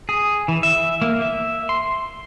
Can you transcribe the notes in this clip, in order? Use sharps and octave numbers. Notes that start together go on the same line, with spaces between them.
G#4
E3
E5
A#3
E5
C6